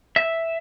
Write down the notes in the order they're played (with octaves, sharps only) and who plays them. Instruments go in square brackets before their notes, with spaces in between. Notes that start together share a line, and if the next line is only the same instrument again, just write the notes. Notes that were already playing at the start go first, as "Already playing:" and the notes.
[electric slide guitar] E5